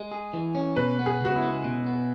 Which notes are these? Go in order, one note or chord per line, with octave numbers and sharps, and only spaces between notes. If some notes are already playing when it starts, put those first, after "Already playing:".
Already playing: G#3
G#4
E3
C#4
B2 B4
B3
G#4
C#2 F#4
E4
G#3
B2
B3